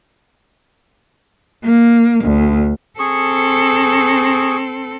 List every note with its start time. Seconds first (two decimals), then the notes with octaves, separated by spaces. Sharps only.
1.65 A#3
2.25 D2
2.99 C4 G#4 A4 C#6